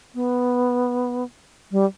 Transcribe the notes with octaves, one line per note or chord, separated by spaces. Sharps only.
B3
G3